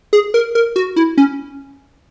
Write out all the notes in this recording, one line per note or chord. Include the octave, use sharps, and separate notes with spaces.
G#4
A#4
A#4
F#4
E4
C#4